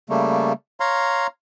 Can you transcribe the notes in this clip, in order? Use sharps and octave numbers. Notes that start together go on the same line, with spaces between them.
C#3 G3 A3 A#3
C#5 F5 A#5 C6